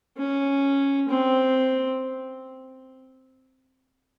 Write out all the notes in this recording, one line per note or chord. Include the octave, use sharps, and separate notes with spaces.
C#4
C4